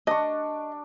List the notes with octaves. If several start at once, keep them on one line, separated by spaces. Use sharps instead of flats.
D4 D#5 C#6